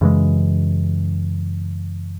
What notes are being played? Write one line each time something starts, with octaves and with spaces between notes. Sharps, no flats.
F#2 C#3 E3 G#3